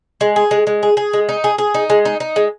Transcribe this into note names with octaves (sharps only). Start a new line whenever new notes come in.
G#3
G#4
G#3
G#3
G#4
G#4
G#3
D#4
G#4
G#4
D#4
G#3
D#4
D#4
G#3